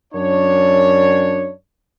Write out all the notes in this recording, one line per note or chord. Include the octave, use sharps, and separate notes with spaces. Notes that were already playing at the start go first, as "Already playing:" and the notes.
F#2 D4 C#5